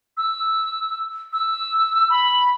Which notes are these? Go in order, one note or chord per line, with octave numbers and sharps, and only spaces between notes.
E6
E6
B5